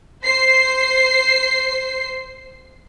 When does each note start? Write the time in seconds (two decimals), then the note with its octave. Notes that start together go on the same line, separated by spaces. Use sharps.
0.25 C5 C7